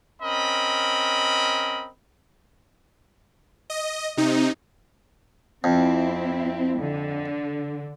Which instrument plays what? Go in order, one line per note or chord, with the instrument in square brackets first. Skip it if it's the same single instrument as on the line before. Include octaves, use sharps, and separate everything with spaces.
[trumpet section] C4 C#4 A#4 D#5 B5
[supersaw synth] D#5
C3 D#4
[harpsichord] F2 [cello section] C4 E4
[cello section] D3